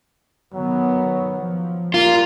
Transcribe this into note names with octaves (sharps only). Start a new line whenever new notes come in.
D#3 F#3 B3
F3
G3 A#3 F4